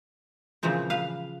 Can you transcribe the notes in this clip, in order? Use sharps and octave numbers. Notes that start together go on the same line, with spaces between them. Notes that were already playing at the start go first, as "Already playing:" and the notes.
A#2 C#3 E3 F3 C4
B4 F5